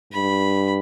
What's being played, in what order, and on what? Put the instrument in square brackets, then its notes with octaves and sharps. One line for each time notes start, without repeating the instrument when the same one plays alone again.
[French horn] G2 [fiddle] B5